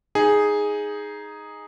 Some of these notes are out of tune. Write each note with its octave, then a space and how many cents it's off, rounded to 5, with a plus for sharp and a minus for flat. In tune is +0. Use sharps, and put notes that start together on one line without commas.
D#4 +5 G#4 +0